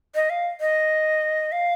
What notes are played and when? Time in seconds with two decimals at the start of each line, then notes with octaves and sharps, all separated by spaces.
0.15 D#5
0.30 F5
0.61 D#5
1.52 F5